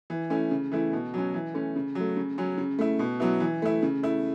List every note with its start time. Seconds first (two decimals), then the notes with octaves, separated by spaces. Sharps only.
0.10 E3
0.30 A3 C#4 E4
0.51 C#3
0.72 E3 A3 E4
0.93 B2
1.14 F#3 C#4
1.34 E3
1.54 A3 C#4
1.76 C#3
1.95 F#3
2.01 A3
2.17 C#3
2.38 F#3 C#4
2.57 C#3
2.79 A3 E4
2.99 B2
3.20 F#3 B3 E4
3.40 E3
3.62 A3 E4
3.82 C#3
4.03 A3 E4